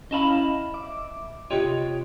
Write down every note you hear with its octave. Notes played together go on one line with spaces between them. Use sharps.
C#4 E4 D#5 F5 A5 B5
E5 D6
C3 F4 G4 C#5 D#5 G5